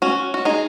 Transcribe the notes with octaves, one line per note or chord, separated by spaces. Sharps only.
C#4 F#4
F#4
D#4 G#4